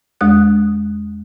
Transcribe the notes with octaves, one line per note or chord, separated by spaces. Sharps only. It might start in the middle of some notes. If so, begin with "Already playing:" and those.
E2 G#3 D#6 F#6